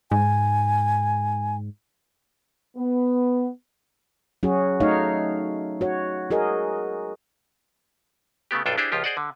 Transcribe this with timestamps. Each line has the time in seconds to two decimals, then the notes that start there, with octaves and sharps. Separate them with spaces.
0.11 G#2 G#5
2.77 B3
4.43 F#3 C#4 F#4 G#4
4.80 A3 D#4 C#5 F5
5.81 F#4 C#5
6.31 F#4 G#4 A#4 D#5
8.51 C#3 A3 B3 G4
8.66 B1 G2 D4 F4 A4 G5
8.78 D4 E4 G4 G#4 C5
8.92 C#2 F3 F4 G4
9.04 G#4 C5 D5 D#5 F#5
9.17 D3